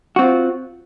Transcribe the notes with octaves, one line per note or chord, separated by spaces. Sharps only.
C4 F4 F#4